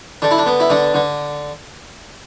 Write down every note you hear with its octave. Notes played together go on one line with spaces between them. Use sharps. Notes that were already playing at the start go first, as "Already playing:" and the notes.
D3 D4
E4
D4
B3
E4
D3 D4
D3